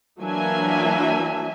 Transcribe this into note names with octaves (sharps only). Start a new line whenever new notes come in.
E3 F#3 A#3 D4 E5 G#5